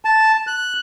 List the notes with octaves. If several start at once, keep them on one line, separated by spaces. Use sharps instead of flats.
A5
F#6